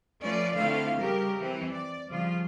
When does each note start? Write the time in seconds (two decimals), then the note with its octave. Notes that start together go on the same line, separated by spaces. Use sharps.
0.22 F3 A3 C#4 F4 B4 D5
0.53 D3 A3 C4 E4 F4 F5
0.98 C#3 G3 G4 A#4
1.38 E3 C4
1.71 D5
2.08 C#3 F3 G3 F4